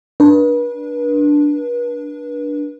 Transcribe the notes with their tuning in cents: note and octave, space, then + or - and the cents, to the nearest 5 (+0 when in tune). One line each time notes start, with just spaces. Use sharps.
D4 +0 B4 -35